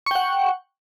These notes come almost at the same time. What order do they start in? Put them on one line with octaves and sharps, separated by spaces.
C#6 G5 F#5